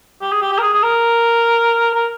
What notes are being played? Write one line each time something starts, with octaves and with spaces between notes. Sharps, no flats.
G4
G#4
G4
G4
A#4
G#4
G#4
A#4
A#4